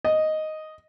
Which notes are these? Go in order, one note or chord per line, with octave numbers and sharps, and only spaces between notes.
D#5